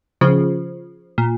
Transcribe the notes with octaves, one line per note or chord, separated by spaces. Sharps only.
C#3 F3
A#2